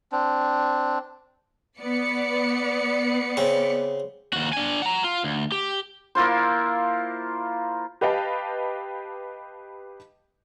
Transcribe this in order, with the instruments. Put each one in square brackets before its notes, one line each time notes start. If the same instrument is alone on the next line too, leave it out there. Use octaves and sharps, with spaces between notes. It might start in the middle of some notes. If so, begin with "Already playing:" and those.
[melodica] C4 D4
[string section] B3 D5 C#7
[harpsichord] C#3 C4
[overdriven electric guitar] D#2 F#4
D4 G#5
F#5 A#5
F4
D2
G4
[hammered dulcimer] A#3 E4 F4 C5
[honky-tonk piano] G4 B4 D#5 F5 G5 A5